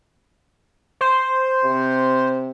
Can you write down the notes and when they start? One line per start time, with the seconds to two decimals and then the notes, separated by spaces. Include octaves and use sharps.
1.01 C5
1.64 C3